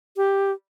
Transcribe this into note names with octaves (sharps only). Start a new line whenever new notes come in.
G4